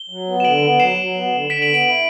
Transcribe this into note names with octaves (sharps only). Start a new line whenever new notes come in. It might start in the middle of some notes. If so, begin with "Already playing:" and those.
Already playing: G7
F#3
B3
E7
D3 D7 F#7
B3
F#3 C7 E7
F#3
B3
D3
D3 B6 D7
D7 F#7
B3
D7 F#7
E4